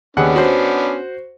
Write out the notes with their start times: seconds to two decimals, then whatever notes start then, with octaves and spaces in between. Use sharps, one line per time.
0.17 D#2 B3 C#4 D4 G#4 F#5
0.36 F#4 C5